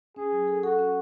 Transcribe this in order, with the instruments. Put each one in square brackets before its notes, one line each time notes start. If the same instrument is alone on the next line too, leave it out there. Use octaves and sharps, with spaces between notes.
[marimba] C#4 [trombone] G#4
[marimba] F#3
A4
[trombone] F#4 [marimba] A4
[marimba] C#4